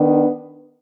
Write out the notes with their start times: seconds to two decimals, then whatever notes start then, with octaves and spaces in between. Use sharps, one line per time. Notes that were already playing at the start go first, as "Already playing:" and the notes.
Already playing: D#3 B3 D4